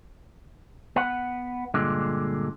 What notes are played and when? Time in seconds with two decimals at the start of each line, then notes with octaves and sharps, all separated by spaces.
0.96 B3 F#5
1.74 G2 A#2 D3 G#3